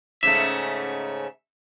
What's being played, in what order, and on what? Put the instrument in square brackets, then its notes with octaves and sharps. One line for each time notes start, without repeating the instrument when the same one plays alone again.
[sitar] G#2 C#3 A3 [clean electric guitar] E5